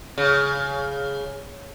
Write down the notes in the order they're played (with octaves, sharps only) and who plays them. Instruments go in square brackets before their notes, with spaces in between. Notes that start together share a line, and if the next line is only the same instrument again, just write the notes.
[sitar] C#3